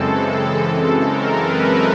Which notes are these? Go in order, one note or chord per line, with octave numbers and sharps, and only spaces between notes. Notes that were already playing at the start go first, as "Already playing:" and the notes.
Already playing: F#2 C#3 E3 G#3 C4 A4
A#4
B4